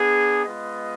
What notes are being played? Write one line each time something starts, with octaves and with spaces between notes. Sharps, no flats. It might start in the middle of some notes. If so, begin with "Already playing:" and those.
Already playing: B3 D4 G#4
G#3 B3 F4 B4 D#5